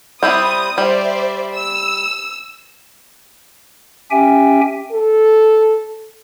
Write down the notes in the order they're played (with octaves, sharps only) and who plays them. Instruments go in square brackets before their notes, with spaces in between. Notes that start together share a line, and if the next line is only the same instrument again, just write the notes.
[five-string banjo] G3 C4 E4 [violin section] D#6
[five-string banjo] G3 [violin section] C5 D5 E5
[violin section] E6
[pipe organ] C#4 G4 E5 G5 G#5
[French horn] A4